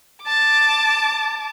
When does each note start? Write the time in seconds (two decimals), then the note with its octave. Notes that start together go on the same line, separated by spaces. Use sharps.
0.22 A5 D6